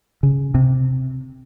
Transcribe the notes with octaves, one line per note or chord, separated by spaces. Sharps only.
C#3
C3